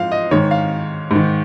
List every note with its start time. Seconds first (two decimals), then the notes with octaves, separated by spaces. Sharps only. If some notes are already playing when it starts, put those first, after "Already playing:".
Already playing: G#2 F3 F5
0.12 D#5
0.31 G#2 D#3 C#5
0.51 F5
1.11 G#2 D#3